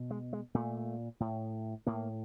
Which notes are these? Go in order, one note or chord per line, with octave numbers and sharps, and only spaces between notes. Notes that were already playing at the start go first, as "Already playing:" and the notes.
Already playing: B2
G#3
G#3
A#2 A3
A2
A2 A#3